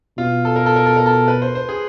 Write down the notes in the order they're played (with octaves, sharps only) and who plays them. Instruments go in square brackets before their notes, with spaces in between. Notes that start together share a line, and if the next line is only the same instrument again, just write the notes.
[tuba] B2 [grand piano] F4
[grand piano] A4
A#4
A4
A#4
A4
A#4
A4
B4
C5
C5
G#4